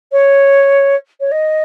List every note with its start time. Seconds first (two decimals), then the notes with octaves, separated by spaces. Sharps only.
0.12 C#5
1.20 C#5
1.31 D#5